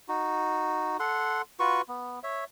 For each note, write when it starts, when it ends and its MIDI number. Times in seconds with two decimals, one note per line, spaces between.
0.08 0.97 63
0.08 0.97 66
1.00 1.42 69
1.00 1.42 78
1.00 1.42 84
1.60 1.81 65
1.60 1.81 66
1.60 1.81 71
1.60 1.81 85
1.88 2.20 59
2.23 2.44 73
2.23 2.44 76